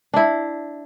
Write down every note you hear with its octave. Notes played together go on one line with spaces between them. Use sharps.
D4 E4